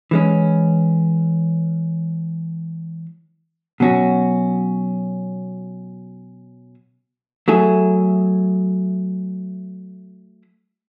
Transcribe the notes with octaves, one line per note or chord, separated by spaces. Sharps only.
E3 G#3 C#4
B2 F#3 C#4 F#4
F#3 A3 E4 G#4